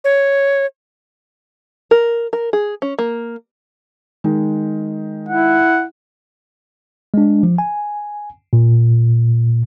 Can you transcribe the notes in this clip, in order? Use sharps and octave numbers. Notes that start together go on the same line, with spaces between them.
C#5
A#4
A#4
G#4
C#4
A#3
D#3 G#3
E4 F#5
G#3 D4
F3
G#5
A#2